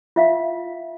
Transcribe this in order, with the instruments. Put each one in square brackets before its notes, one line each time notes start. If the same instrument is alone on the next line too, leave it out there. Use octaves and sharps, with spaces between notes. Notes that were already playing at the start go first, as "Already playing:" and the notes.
[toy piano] F4 E5 F5